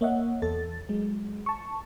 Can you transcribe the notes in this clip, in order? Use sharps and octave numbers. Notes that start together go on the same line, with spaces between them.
A#3 C#5 D#5 E5 F#5
E2 A4 A6
F#3 G#3
A5 C#6